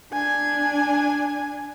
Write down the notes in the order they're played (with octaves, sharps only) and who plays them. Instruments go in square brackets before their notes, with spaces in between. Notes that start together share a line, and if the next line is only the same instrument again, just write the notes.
[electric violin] D4 G#5